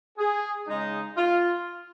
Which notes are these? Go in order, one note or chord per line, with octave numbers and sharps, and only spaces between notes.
G#4
C#3 G#3 D#4
F4